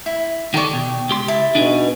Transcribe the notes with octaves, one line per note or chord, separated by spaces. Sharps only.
E4
D#3 G4 A4 D5 C#6
B2
C#2 G4 C6
E4 A5
B2 D4 D#4 G#4